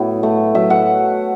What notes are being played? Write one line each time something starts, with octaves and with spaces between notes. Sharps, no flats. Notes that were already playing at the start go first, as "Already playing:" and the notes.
Already playing: A2 F#3 B3 F#5
A3
F#3 E5
F#5